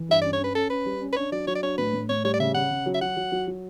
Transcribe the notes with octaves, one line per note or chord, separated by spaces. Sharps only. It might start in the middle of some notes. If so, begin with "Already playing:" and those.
Already playing: E3
G2 E5
C#4 D5
C#5
C#4 B4
C#4 A4
C#4 B4
G3
C#4
B4
D4 C#5
F#3 D5
F#3 C#5
D5
D4 C#5
A2 B4
A2
A2 C#5
G3 C#5
D5
C#3 E5
C#3 F#5
C#3
F#3
E5
F#3 F#5
F#3
F#3
F#3